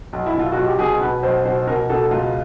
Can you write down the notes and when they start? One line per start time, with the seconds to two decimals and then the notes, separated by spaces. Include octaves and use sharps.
0.13 B1
0.26 E4
0.35 B2 F4
0.52 B1 F#4
0.66 G4
0.79 B2 G#4
1.01 B2 B4
1.23 B1 C5
1.45 B2 C5
1.67 B2 A#4
1.89 B2 A4
2.11 C#2 F4